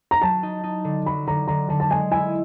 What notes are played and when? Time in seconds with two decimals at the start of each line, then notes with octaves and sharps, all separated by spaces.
0.11 A#5
0.22 F#3 A5
0.43 D#4
0.63 D#4
0.84 D3
1.06 F#3 B5
1.27 D3 A#5
1.48 D3 A#5
1.69 D3 A5
1.80 A5
1.90 G#3 G#5
2.11 E4 G#5